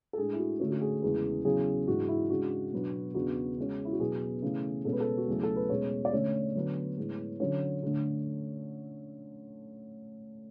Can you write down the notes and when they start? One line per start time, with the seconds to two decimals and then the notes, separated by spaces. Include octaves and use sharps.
0.13 A4
0.17 A2 G#3 D4 G#4
0.33 E4
0.39 F#4
0.60 D3 A3 C#4 F#4
0.70 F#4
0.81 G#4
1.02 E2 C#3 E3 G#3 B3
1.45 E2 C#3 F#3 G#4
1.88 G#2 E3 G#3 D4 F#4
2.08 E4
2.30 C#3 G#3 D4 F#4
2.72 B2 F#3 B3 D4
3.15 E2 C#3 E3 B3 D4 F#4
3.57 C#3 G#3 C#4
3.85 E4
3.92 F#4
4.00 B2 F#3 B3 G#4
4.42 C#3 E3 A3 C#4
4.85 B2 G#3 C#4 A4
4.93 B4
5.00 A4
5.17 F#4
5.27 E2 C#3 F#3 A3 G#4
5.43 A4
5.56 B4
5.69 B2 G#3 C#4 C#5
6.05 D5
6.12 D3 A3 C#4 C#5
6.55 D3 F#3 B3 D4
6.97 A2 G#3 B3
7.40 D3 F#3 C#4 C#5
7.83 D3 A3 D4